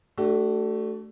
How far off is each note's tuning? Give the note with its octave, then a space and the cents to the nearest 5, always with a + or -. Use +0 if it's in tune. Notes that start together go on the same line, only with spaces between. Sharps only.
A3 +0 D4 +0 F#4 +45